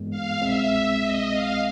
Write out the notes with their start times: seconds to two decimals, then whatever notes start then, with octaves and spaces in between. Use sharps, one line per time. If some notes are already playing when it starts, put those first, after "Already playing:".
Already playing: G2 E3 G#3 B3
0.10 F5
0.41 C2 B2 G#3 C4 E5
1.02 D#5
1.32 F5